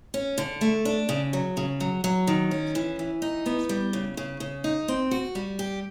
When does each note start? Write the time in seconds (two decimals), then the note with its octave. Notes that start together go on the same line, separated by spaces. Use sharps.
0.14 C#4
0.38 D3
0.61 A3
0.85 D4
1.09 C#3
1.33 F#3
1.57 C#3
1.80 F#3
2.04 F#3
2.27 D#3
2.51 C#4
2.75 E3
2.99 E3
3.22 D#4
3.46 B3
3.69 G3
3.93 C#3
4.17 C#3
4.40 C#3
4.64 D#4
4.88 C4
5.11 F#4
5.35 G3
5.59 G4